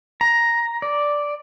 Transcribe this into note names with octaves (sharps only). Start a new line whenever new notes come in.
A#5
D5